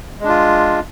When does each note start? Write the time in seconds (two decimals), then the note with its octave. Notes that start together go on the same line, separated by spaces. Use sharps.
0.20 G#3
0.24 D4
0.29 F4